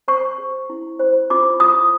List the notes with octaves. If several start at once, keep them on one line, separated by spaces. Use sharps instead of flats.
C5 C#6
G#4
E4
C5
F4 D6
F4 D#6